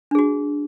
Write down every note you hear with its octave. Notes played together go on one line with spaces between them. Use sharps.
D4 F#4 G#4